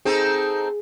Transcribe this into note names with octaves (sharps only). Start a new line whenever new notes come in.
C4 D#4 G#4 A4